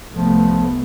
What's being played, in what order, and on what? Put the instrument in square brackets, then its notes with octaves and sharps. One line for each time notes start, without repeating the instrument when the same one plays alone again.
[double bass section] C2 A3 B3 [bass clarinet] F3